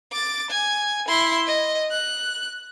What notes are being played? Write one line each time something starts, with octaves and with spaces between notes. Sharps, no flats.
D6 A6
G#5
E4 C6
D#5
F#6